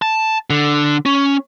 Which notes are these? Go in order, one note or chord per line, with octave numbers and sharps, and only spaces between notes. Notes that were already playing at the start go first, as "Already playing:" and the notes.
A5
D3
C#4